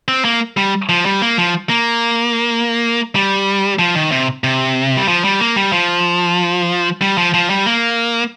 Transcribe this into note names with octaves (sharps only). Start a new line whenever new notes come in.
C4
A#3
G3
F3
G3
A#3
F3
A#3
G3
F3
D#3
C3
C3
G3
F3
G3
A#3
G3
F3
G3
F3
F3
G3
A#3